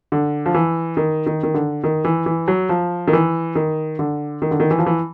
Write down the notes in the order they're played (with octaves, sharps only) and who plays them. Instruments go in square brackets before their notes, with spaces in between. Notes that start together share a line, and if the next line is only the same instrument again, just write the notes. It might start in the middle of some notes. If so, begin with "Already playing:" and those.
[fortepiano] D3
F3
E3
D#3
D#3
D#3
D3
D#3
E3
E3
F#3
F3
D#3
E3
D#3
D3
D#3
D3
D#3
E3
F3
E3